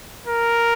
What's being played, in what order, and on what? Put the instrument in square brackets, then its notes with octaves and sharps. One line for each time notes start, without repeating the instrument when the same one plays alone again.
[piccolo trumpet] A#4